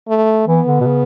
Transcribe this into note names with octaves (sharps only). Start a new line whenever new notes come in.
A3
E3 B3
D3
B2
C#3